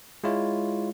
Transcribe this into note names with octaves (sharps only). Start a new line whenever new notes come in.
G#3 E4 F4 C#5